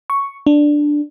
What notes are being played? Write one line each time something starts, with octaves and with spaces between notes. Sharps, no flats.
C#6
D4